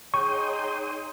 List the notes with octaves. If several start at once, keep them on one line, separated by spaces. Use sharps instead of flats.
D#4 G#4 C#5 G5 C6 C#6 D#6